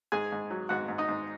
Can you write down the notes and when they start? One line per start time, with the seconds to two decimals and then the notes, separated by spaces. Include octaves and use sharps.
0.12 G#2 G#4 G#5
0.32 G#2
0.50 F#3
0.69 G#2 F#4 F#5
0.88 G#2
0.98 D#4 D#5
1.08 G#2